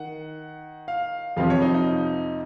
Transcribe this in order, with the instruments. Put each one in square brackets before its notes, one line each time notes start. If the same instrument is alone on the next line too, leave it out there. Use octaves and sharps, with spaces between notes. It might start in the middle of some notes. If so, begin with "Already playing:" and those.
Already playing: [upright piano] D#3 [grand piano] F#5
[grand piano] F5
[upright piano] F2 C3 F3 [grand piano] F5
[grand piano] C#5
D#4
D#4